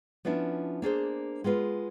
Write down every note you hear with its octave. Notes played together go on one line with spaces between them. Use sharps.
F3 B3 C#4 D4 E4
A#3 D4 G#4 C5
G#3 B3 F4 B4